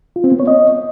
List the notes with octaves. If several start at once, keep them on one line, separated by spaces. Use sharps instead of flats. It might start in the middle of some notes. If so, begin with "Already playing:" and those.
F4
C4
B3
C#5
D#5